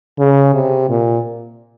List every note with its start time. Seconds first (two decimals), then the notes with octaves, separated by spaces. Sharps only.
0.19 C#3
0.54 C3
0.89 A#2